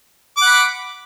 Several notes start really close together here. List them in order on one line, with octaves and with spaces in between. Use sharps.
D6 F#5 B5